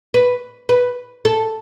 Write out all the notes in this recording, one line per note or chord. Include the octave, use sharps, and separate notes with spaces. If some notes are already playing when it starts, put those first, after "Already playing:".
B4
B4
A4